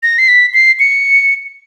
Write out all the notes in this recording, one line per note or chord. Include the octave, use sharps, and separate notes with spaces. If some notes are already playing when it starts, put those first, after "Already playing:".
A#6
C7
B6
C7
C#7